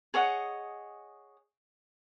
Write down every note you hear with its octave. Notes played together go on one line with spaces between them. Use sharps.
G#4 C#5 D#5 F#5